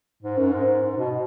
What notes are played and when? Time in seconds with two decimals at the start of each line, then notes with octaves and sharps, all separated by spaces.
0.22 G#2
0.37 F#2
0.52 G#2
0.81 G#2
0.97 B2